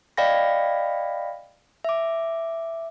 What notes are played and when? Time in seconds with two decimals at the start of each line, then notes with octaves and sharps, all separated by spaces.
0.17 D5 D#5 F5 G5 B5 A#6
1.85 E5 D6